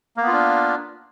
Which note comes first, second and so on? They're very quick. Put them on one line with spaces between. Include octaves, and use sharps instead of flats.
A#3 B3 F4 D4